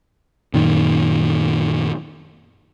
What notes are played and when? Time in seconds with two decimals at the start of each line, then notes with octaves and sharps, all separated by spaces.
0.54 F#2 A#2 D#3